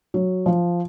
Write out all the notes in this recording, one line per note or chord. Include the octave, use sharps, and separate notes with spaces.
F#3
F3